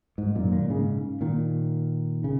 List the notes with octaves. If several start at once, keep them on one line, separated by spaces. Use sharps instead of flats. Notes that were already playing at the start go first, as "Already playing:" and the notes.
G#2
F#2 A#2
A#2 D#3
G#2 C#3
A#2 D#3
C#3